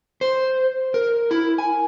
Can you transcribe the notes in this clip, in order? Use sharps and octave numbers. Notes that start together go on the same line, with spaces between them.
C5
A#4
E4
G#5